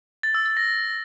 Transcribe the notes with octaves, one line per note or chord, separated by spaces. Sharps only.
A6
E6
A6
A#6